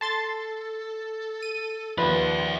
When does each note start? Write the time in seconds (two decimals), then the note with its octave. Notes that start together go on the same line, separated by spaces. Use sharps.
0.01 A4 A5 C6 A6
1.43 D#7
1.98 D#2 F3 B4 D5 E5 C6